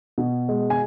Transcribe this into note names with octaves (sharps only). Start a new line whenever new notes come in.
B2
G#3
G#5